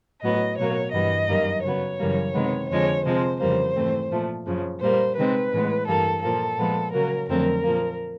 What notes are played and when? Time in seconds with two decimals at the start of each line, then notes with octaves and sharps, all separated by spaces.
0.22 A2 F#3 B3 D#5
0.58 B2 F#3 A#3 C#5
0.92 G2 E3 G3 B3 D#5
1.28 F#2 D#3 G3 A#3
1.64 C#3 F#3 B3 C#5
1.99 F#2 C#3 E3 G3 A#3
2.34 C3 D#3 G#3 B3
2.69 F2 D3 F3 G#3 C#5
3.05 C3 F3 G#3 C5
3.40 F2 C#3 E3 G3 A#3 C5
3.75 G#2 E3 A3 C4
4.11 A#2 F3 A3
4.46 F#2 C#3 F3
4.81 A#2 G3 A#3 C5
5.17 C3 D#3 G#3 C4 B4
5.52 A2 E3 G#3 B3
5.87 G2 E3 G3 A#3 A4
6.22 A#2 F3 A#3 A4
6.57 A#2 F3 G#3 B3
6.93 C#3 F#3 A#3 A#4
7.28 F2 D3 F#3 A3 C4 A#4
7.63 A#2 F3 A#3